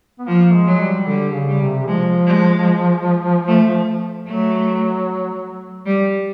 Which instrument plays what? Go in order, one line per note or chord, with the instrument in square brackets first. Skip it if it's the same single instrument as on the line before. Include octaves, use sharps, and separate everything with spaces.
[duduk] B3
[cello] F3 [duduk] A#3
[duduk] G#3
[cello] F#3
[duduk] G3
[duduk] D3 [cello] G3
[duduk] C#3
[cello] G3
[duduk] C3
[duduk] F3 [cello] G#3
[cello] G#3
A3
[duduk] F#3 [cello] A3
[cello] G3